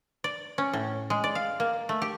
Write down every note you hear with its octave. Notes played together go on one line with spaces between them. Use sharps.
D5
C#4
A2
G#3
D5
F5
A#3
A3
G4